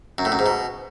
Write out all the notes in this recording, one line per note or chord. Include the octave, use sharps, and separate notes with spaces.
F#2
A2
F#2
G#2
B2